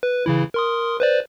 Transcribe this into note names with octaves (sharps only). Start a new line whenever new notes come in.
B4
C#3 E3 E4
A#4 C6 D#6
B4 C5 D5